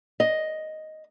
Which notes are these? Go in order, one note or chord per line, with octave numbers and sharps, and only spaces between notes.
D#5